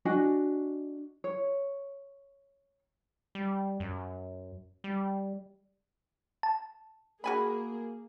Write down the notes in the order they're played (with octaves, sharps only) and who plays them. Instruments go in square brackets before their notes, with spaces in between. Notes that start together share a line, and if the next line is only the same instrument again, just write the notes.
[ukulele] D4 F#4 D#5 G#5
C#5
[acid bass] G3
F#2
G3
[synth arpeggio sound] A5
[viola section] A#3 G#4 [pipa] F#4 G#5 B5